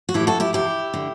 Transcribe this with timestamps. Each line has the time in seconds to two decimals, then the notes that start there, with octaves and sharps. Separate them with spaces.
0.09 F#4
0.14 A2 E3 E4 G4
0.27 F#4 A4
0.40 E4 G4
0.53 E2 B2 E4 G4
0.94 D3